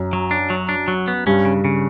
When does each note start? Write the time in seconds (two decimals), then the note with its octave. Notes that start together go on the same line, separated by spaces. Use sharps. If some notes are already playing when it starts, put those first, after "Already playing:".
Already playing: F#2
0.13 F#3
0.31 D4
0.50 F#3
0.69 D4
0.88 F#3
1.08 B3
1.26 G2 C#4
1.45 C#3
1.65 C#3